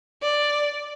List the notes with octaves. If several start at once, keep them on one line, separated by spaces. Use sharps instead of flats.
D5